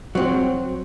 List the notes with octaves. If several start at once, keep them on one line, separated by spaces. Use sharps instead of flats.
F#3 C4